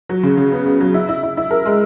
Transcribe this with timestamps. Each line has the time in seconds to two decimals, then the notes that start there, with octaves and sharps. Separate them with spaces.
0.09 F#3
0.23 C#3
0.37 C#3
0.52 B3
0.66 B3
0.81 F#3
0.94 E4
1.09 E4
1.23 E4
1.37 E4
1.51 A#4
1.66 G#3